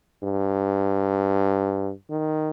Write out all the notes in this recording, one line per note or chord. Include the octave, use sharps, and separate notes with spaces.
G2
D#3